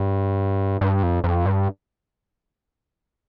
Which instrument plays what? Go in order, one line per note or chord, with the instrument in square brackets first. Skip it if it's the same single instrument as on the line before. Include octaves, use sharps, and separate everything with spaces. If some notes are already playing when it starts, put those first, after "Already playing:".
Already playing: [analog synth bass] G2
G2
F2
F2
G2